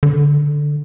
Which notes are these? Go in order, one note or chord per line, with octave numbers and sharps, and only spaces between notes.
D3